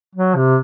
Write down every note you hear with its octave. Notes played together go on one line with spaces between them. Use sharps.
F#3
C3